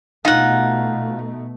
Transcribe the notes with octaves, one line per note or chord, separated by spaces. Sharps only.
B2 A3 D#4 F4 F#5